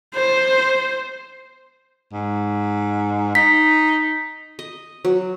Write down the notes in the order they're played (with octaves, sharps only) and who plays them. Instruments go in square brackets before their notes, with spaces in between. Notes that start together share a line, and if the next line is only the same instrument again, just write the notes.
[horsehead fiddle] C5
[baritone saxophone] G#2
[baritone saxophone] D#4 [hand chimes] B6
[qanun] D#5
F#3